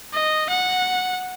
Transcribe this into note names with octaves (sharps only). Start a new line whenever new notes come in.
D#5
F#5